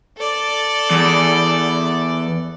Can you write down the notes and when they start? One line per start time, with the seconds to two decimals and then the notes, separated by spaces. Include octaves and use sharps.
0.18 A4 D5
0.91 E2